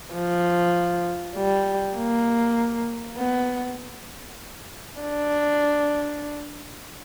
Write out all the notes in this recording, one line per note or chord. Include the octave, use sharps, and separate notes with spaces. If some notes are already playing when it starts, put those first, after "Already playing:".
F3
G3
A#3
B3
D4